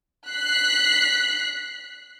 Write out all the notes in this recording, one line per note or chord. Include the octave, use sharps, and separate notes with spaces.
F#6 B6 C7